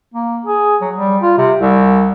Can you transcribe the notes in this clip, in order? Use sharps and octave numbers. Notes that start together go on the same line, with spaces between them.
A#3
G#4
F#3
G3
F4
C3
C2